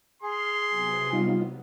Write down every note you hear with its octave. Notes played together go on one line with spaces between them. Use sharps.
G#4 C6 F6
C3 F#3 B3
G3 D#4 F4